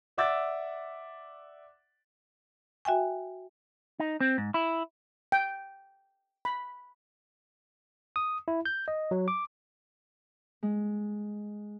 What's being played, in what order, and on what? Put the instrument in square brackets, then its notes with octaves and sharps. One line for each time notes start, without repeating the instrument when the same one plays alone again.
[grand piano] D5 E5 F#5 D6 E6 A6
[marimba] F#4 E5 G5 G#5
[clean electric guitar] D#4
C4
G#2
E4
[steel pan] G5
B5
[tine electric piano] D#6
E4
G6
D#5
F#3
D6
[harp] G#3